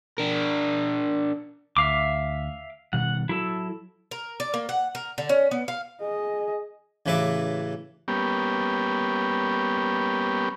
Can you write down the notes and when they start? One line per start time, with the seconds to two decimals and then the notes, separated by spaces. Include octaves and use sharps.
0.18 D4 A#4
1.77 D2 E5 F5 D6
2.93 B2 D#3 G3 F#5
3.29 F#3 E4 A4
4.11 A#4
4.40 D5
4.54 A#3
4.69 F#5
4.95 A#4
5.18 D3
5.29 C#4
5.51 B3
5.68 F5
6.01 G#4 D#5
7.06 A1 C#3 E3 B4 E5 D6
8.08 G3 A#3 B3 C#4 G4